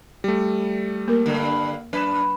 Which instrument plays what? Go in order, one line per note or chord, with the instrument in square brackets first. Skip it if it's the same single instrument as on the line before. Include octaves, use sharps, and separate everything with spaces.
[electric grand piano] G3 A3
[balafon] A#3 A#4
[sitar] G2 D3
[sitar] F#2 B4 [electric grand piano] D4 E7